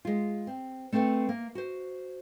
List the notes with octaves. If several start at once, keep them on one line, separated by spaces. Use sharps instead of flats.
G#3 F4
C4
A3 C4 A4 B4 F#5
A#3
F#4 C5